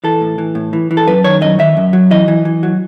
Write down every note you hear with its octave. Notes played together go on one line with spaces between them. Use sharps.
E3 A4
A2
E3
A2
E3
E3
A4
F#2 B4
D#3 C#5
F#2 D#5
D#3 E5
F#2
F#3
E3 D#5
E3
E3
F#3